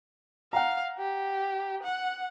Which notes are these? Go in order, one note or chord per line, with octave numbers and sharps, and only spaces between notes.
F5 F#5 A#5
G4
F#5